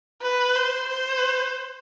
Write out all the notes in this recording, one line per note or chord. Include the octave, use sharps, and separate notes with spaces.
B4
C5
C5